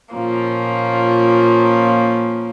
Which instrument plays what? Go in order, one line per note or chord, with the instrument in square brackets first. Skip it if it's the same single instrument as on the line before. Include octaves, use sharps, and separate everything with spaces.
[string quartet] A#2 F3 A#3 C#4